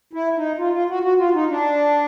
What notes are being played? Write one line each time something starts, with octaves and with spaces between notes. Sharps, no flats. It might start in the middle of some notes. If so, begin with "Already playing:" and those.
E4
D#4
F4
F4
F#4
F#4
F4
D#4
D4